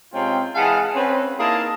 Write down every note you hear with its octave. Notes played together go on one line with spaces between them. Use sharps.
C3 G#3 C4 C#4 F4 G5
E3 G#3 G#4 F5 F#5 A5
C4 C#4 B4
A#3 D#4 E4 G#4 A#4 A5